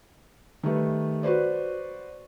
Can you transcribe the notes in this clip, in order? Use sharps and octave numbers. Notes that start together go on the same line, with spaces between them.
D#3 G3 A3 B4
F#4 B4 C5 D5